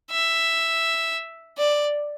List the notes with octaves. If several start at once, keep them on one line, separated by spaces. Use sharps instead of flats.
E5
D5